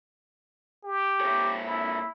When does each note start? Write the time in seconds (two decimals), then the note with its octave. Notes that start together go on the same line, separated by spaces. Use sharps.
0.84 G4
1.21 A#2 C#5
1.65 E4